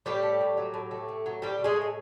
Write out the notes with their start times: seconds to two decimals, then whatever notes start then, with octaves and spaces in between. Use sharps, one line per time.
0.06 A2 G3 G4
0.23 A3
0.41 A2
0.57 F#3
0.74 A2
0.91 A3
1.08 A2
1.26 F#3
1.42 A2 G3 G4
1.59 A3
1.64 G#3 G#4
1.76 A2
1.81 G#4